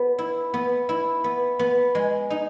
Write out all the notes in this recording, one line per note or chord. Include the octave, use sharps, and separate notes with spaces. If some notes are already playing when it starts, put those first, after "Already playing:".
Already playing: B3
E4
B3
E4
B3
B3
G#3
D#4